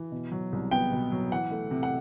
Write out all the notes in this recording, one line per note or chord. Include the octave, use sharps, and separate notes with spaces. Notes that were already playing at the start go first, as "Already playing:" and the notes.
Already playing: E3
B2
F#3
C2
B3 G5
B2
F#3
E3 F#5
A3
C3
F#5